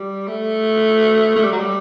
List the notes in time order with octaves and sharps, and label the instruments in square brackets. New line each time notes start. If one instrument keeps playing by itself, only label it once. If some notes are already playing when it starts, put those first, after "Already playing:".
Already playing: [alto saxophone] G3
A3
A3
G3
F#3
G3